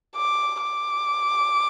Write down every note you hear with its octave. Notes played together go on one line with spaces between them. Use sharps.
D6
D6